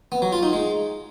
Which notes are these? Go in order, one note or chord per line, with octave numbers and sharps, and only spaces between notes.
B3
F#3
F4
D#4
G#3